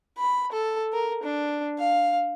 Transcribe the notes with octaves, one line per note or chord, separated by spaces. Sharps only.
B5
A4
A#4
D4
F5